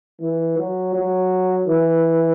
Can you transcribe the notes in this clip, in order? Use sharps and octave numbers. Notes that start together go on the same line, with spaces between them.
E3
F#3
F#3
E3